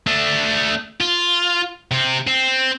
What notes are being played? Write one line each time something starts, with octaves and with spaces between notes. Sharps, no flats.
A3 D4
F4
C3 C4
C4